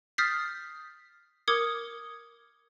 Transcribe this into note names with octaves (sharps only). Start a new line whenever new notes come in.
D#6 F6 G6 A6 B6 C7
A#4 D6 D#6 G#6 C#7